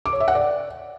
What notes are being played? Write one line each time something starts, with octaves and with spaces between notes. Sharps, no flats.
D6
C#5
E5
F#5
D5